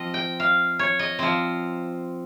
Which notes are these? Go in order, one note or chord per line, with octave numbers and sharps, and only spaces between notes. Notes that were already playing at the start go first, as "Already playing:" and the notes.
Already playing: F3 C4 D#5
G5
F5
C#5
D#5
F3 C4